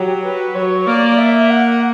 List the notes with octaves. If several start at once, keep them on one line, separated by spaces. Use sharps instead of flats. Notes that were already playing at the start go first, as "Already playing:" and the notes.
Already playing: F#3 G4
B4
F#3 C#5
A#3 D5
E5
F#5